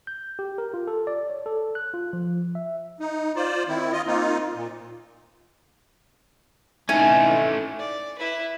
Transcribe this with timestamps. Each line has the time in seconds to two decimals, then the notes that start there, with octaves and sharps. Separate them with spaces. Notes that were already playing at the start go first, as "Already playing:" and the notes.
0.07 G6
0.39 G4
0.58 A#4
0.74 F4
0.87 A4
1.07 D5
1.30 C#5
1.46 A4
1.75 F#6
1.94 F4
2.13 F3
2.55 E5
3.00 D#4
3.36 F4 C5 D5
3.68 D#3 C4 E4
3.92 F4 D#5
4.07 A#3 C4 D#4 F4
4.55 A#2
6.89 C3 E3 A3 C#4 D#4 E4 G#5
7.79 D5
8.18 E4 B4